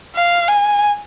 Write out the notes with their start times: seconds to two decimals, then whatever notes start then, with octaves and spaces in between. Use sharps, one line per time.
0.15 F5
0.48 G#5